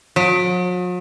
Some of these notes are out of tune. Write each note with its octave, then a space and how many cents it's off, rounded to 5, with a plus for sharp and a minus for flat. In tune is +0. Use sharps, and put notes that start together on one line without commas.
F#3 -45